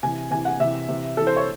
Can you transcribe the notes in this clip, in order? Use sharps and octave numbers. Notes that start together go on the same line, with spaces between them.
C3 E3 G#5
C3 E3 G#5
F#5
C3 E3 E5
C3 E3
C3 E3 A4
C5
C#5